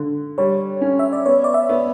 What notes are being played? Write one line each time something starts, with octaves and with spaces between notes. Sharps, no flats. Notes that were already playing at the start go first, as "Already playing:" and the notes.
Already playing: D3
G3 C#5
C#4
E5
D5
B3 C#5
D5
E5
B3